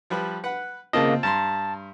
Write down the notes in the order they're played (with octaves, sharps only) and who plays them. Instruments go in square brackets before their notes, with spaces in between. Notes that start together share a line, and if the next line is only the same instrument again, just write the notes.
[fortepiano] F3 G3 B4
B4 F#5 B5
[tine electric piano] C#3 A#3 D#5 [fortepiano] C4 F4 A5
[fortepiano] G2 A#5 C6 [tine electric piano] A5